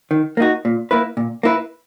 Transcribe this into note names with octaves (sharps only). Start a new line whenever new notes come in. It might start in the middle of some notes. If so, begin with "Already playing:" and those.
D#3
A#3 D#4 F#4
A#2
A#3 E4 B4
A#2
A#3 E4 B4